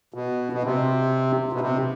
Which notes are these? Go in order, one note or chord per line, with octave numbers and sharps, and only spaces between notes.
B2
B2
C3
B2
C3